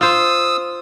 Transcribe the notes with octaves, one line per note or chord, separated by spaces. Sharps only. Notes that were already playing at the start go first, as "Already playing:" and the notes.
F4 C5 D#6 E6